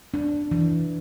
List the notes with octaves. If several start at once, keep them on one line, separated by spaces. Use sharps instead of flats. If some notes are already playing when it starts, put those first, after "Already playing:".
D4
E3